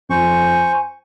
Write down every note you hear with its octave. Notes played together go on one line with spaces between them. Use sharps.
F2 C5 G#5 C#6